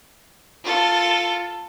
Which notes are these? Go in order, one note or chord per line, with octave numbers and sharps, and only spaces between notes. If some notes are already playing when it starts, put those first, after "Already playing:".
F4 A4